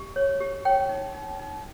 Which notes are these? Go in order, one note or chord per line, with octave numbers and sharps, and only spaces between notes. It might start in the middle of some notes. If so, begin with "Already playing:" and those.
Already playing: G4
C#5
G4
C#5 G5
D#4
D#4
D#4